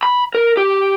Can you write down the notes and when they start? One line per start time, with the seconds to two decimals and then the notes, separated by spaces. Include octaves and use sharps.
0.03 B5
0.35 A#4
0.57 G4